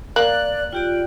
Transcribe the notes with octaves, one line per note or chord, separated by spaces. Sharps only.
A#3 D5 F#6
F4 G4 D5 G5